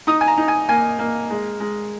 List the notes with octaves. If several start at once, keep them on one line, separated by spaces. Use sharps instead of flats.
D#4 D#6
G#5
A#5
D#4
G#5
A#3 G#5
A#3
G#3
G#3